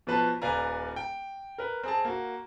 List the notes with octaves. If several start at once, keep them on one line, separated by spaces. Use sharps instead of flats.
B2 F3 B4 A5
D#1 B4 D5 F5 G#5 A#5
G5
A#4 B4
C4 G#4 A5
A#3 F#4